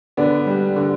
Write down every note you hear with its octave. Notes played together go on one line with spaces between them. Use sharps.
D3 B3 D4
G3
D3